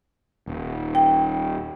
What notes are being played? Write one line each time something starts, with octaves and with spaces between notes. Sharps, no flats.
D#1
G5